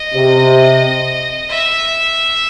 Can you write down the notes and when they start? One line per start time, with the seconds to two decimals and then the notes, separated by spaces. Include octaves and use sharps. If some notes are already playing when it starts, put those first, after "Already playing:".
Already playing: D#5
0.15 C3
1.51 E5